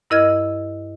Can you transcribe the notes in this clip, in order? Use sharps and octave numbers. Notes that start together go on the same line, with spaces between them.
G2 E4 A#4 D#5 F6 G#6